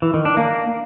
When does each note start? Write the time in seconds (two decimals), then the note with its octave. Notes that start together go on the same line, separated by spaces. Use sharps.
0.02 E3
0.14 D#3
0.25 D4
0.37 A#3